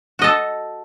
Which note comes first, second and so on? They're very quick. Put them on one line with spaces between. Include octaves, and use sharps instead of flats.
F#4 D#5 A4